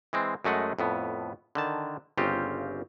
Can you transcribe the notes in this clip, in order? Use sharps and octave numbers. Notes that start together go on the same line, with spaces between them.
E3 G#3 C4
F#2 G#3 A3 D#5 F#5
F2 A2 B3
D3 D#3 A5
G1 C#3 C4 F4 G4